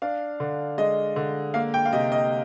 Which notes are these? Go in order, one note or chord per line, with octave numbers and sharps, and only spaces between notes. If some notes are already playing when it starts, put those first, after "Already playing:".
D4 F5
D3
G#3 D#5
D3
A#3 F5
G5
F5
C3 D#5
D#5